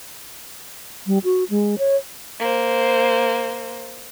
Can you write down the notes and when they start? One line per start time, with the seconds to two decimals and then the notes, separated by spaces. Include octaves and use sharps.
1.07 G3
1.24 F#4
1.50 G#3
1.78 C#5
2.40 A#3 C5